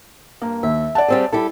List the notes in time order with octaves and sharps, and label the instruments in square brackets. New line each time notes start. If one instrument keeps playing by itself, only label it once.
[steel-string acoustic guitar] G2 [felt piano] A#3
[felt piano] D#2 [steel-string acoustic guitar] E5
[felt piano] D5 F#5 A5
[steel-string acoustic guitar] G3 C4 G#4
[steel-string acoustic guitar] G3 A4 [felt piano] E4